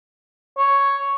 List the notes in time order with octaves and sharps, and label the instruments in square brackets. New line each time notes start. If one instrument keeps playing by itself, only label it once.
[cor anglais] C#5